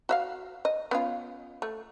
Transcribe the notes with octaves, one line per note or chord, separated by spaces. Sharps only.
F#4 E5 F5
D#5
B3 C#4 F4
A3